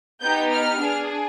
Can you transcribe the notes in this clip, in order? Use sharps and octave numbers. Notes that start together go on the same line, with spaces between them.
B3 D#4 G4 G6
F6
D4 G#4